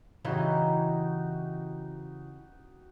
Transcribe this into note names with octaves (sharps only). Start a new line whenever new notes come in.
C#3 E3 D#4 F#4 G4 D#5